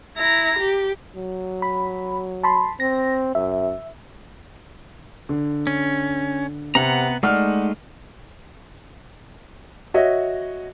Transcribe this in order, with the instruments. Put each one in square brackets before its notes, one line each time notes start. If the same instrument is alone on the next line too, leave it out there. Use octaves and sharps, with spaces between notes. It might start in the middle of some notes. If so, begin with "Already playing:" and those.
[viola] E4 A#5
G4
[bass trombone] F#3
[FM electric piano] B5
A5 B5 C6
[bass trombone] C4 [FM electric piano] A#6
[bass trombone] F#2 [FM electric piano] E5
[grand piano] D3
[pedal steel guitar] C#4
[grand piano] C3 [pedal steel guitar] B3 F#5 A#5
[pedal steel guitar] G#3 A3 D#4 [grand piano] D5 F#5 F6
[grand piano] F#4 C#5 D#5 E5